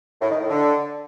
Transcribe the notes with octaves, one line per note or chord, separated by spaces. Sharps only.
A2
D#3
A2
D3